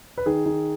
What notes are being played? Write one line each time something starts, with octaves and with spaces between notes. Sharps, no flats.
B4
D#3 G#4
D#3